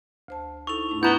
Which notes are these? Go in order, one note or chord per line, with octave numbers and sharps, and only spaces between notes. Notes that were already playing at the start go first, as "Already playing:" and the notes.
D2 C5 A5
D#4 E4 A4 C#6 F7
G#2 A3 D4
B3 E4 A#5 G6 G7